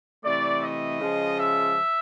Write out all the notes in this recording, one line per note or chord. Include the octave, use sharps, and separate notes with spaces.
C3 E3 A3 D5
D#5
C#3 F3 G#3
E5